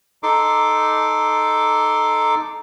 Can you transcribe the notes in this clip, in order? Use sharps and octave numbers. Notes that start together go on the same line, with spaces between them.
D#4 A4 C6 D6